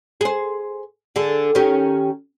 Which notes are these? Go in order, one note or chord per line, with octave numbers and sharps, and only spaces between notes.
G#4 C5
D3 G#4
D#3 C#4 G4